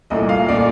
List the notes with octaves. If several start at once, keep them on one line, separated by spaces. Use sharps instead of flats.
C2 A#2 A3 D#5
F5
A#2 A3 D5